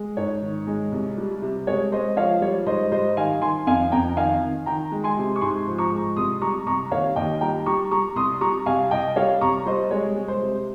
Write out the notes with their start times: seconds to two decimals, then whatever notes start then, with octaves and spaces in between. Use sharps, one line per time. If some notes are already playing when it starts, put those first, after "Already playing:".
Already playing: G#3
0.17 G#2 C#5
0.42 D#3
0.67 G#3
0.92 C2
1.17 G3
1.42 C3
1.67 G#3 C#5
1.92 G#3 C5 D#5
2.17 F3 C#5 F5
2.41 G3 C#5
2.66 G#2 C5 D#5
2.92 G3 C5 D#5
3.17 D#3 F5 G#5
3.41 D#3 G#5 C6
3.67 F2 F5 G#5
3.92 F2 G5 A#5
4.17 D#3 F5 G#5
4.41 D#3
4.66 D#3 G5 A#5
4.91 G#3
5.04 G#5 C6
5.17 C3
5.36 C#6
5.41 G#2 G#5 C6
5.66 F3
5.78 A#5 C#6
5.91 G#3
6.16 C2 C6 D#6
6.42 G3 A#5 C#6
6.66 C2 A#5 C#6
6.91 D#2 C#5 F5
7.16 D#2 D#5 G5
7.41 G3 G5 A#5
7.66 G3 A#5 C#6
7.91 G3 A#5 C#6
8.16 C2 C6 D#6
8.41 G3 A#5 C#6
8.66 C2 F5 G#5
8.91 C2 D#5 G5
9.16 G3 C#5 F5
9.41 C2 A#5 C#6
9.66 G3 C5 D#5
9.91 G#3 C#5
10.16 G#3
10.28 C5
10.42 C3